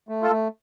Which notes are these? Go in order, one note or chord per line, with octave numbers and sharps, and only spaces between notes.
A3
F4 A4
A3